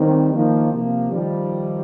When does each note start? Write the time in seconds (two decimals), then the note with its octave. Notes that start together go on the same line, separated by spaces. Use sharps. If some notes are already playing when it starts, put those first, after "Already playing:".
Already playing: D#3 G3 C4
0.33 D#3 F3 A#3
0.73 C3 F3 A#3
1.12 D#3 F3 G3